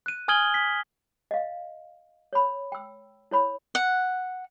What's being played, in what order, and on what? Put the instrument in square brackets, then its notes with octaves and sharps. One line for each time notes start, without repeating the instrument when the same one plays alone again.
[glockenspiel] F#6 D#7
G#5 D#6 F6 G#6 F#7 G7
B6
[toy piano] D#5 F5
C#5 B5
G5 E6
E4 C#5 B5
[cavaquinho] F#5